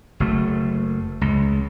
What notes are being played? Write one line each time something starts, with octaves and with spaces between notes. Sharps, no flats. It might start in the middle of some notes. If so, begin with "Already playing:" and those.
F#1 A3
C#2